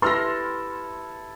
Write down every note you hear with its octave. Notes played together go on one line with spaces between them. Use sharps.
E4 G4 A4 B4 C6 F6 A#6